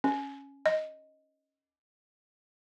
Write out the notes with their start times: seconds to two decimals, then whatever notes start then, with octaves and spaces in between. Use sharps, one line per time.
0.04 C#4
0.66 D#5